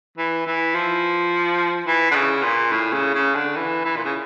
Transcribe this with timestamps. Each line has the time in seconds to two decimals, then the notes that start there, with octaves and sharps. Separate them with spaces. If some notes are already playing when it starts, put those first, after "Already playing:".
0.18 E3
0.46 E3
0.75 F3
1.87 E3
2.11 D3
2.15 C#3
2.43 A#2
2.72 A2
2.93 C#3
3.14 C#3
3.35 D3
3.56 E3
3.85 E3
3.96 A#2
4.05 C#3